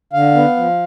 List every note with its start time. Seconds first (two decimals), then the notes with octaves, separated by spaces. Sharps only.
0.13 D3 F5
0.35 B3
0.57 F3